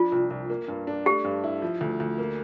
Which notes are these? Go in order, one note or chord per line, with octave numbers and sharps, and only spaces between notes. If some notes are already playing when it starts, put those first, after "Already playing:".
Already playing: F3 D4 F4
C2
C2
A#3
G2
D4
A3 G4
G2
E4
F3
D2
D2
A#3